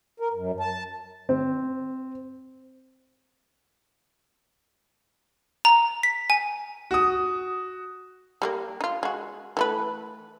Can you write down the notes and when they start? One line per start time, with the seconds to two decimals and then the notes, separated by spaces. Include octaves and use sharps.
0.20 A#4
0.33 F#2
0.60 A5
1.29 C4
5.65 A#5
6.03 B6
6.30 G#5
6.91 F#4 D#6
8.42 G3 G#3 A#3
8.81 D#4 F4
9.03 G#3 F#4
9.57 E3 A3 B4